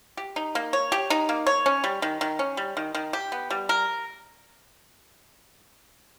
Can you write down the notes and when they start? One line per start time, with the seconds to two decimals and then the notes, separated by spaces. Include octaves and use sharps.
0.17 G4
0.36 D#4
0.55 A#3
0.73 C#5
0.92 G4
1.10 D#4
1.29 A#3
1.47 C#5
1.66 C#4
1.84 G3
2.02 D#3
2.21 D#3
2.39 C#4
2.57 G3
2.77 D#3
2.95 D#3
3.13 G4
3.32 B3
3.50 G3
3.69 A#4